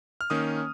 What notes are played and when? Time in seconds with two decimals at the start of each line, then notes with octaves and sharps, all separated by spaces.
0.21 F6
0.30 D#3 A#3 C#4 D#6